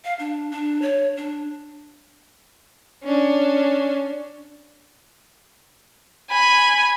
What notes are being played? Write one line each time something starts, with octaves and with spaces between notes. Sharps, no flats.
F5
D4
D4
C#5
D4
C#4 D4
G#5 B5